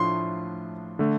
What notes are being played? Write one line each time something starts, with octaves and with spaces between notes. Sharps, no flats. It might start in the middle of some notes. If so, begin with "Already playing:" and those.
Already playing: A2 F3 A3 D4 F4 C6
D3 A3